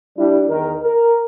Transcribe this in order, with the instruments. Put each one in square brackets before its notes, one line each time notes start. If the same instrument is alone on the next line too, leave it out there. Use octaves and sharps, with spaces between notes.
[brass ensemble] G3 D4 E4
E2 D#3 D#4 A#4
A#4